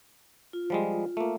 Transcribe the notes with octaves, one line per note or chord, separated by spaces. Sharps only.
F4
F3 G3 G#3
A3 A#3